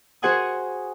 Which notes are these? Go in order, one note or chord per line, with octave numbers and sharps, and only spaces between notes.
F#4 G#4 C5 F#5 G#5 D#6